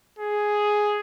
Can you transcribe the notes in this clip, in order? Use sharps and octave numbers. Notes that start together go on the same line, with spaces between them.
G#4